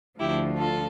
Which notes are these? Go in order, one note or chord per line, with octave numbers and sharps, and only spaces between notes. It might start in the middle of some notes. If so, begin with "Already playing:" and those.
D2 D3 F3 E4 G4
F4 A4